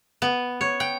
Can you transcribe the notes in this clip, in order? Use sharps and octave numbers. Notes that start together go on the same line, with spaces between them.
B3
C#5
G5